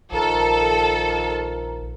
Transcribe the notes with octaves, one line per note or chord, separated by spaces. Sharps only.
A#1 D#3 F3 A4 A#4